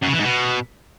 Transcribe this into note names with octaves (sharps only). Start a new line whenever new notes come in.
F#2
C#3
E3
G#2
B2